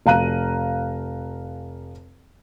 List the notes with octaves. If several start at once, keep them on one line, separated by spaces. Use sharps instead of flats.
F1 F5 A#5 F#6 D#7